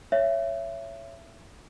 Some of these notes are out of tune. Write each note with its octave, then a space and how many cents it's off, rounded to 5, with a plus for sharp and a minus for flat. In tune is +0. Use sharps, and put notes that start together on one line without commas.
C#5 +0 E5 +25